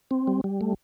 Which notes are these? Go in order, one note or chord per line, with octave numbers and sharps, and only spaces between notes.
C4
G3
G3
A3